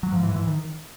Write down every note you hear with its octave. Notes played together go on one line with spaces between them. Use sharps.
F#3
G#2 F3
E3
G#2
E3
D#3